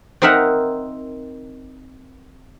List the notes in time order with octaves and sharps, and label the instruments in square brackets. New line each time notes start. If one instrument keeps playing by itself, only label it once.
[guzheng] C4 D#4 A#4 E5 F#5 A#5